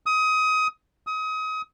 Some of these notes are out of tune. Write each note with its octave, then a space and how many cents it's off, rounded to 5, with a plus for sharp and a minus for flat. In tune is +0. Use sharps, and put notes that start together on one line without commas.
D#6 +25
D#6 +30